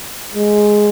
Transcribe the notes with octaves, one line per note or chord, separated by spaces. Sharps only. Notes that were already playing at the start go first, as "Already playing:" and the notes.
G#3